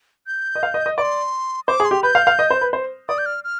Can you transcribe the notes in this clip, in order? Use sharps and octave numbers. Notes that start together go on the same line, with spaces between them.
G6
D#5
F5
D#5
D#5
D5 C6 D6
C5 D6
G#4
C6
G4
B4 G6
F5
F5
D#5
C5
B4
C5
D5 D#6
G6
F6
F6